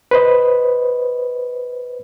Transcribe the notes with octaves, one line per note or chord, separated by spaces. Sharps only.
B4 C5 D#5